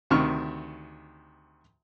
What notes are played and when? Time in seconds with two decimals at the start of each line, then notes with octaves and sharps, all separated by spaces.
0.10 D2 C3 D#3 C#6 F6